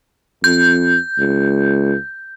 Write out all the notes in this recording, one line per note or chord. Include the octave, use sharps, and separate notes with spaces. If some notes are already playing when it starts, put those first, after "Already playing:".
F2 G6
C#2